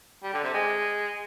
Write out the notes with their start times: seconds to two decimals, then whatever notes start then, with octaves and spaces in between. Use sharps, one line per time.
0.23 G3
0.33 D3
0.43 C3
0.54 G#3